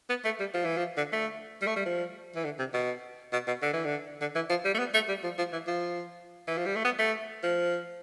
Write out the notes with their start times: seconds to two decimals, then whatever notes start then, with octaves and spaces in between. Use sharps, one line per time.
0.09 B3
0.24 A3
0.40 G3
0.54 F3
0.65 E3
0.77 F3
0.97 D3
1.12 A3
1.62 G3
1.66 A3
1.76 G3
1.86 F3
2.35 E3
2.44 D3
2.59 C3
2.74 B2
3.33 B2
3.47 B2
3.62 D3
3.73 E3
3.85 D3
4.21 D3
4.35 E3
4.50 F3
4.65 G3
4.74 A3
4.79 B3
4.94 A3
5.08 G3
5.23 F3
5.38 F3
5.52 E3
5.67 F3
6.47 E3
6.57 F3
6.66 G3
6.76 A3
6.85 B3
6.98 A3
7.43 F3